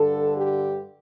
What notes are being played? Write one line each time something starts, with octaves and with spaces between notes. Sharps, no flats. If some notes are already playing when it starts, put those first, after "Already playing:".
Already playing: G2 D3 A4
G4